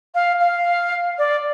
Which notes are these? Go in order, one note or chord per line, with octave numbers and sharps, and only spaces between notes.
F5
F5
D5